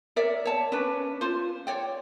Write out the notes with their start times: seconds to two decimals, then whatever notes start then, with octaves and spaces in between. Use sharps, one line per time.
0.16 A#4 C#5 D5 E5
0.45 C#5 A5
0.72 C#4 D4 B4
1.21 F4 C5
1.67 C#5 D5 G5